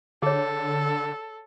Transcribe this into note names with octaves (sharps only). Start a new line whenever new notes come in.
D3 G#4 A4 C#5